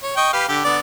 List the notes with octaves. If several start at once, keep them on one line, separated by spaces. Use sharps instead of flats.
C#5
D#5 G5 C#6
G4 B4 F5
D3 G4
D3 B3 D5